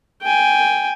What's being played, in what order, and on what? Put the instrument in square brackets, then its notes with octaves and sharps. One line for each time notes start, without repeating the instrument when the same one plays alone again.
[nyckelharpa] G5 G#5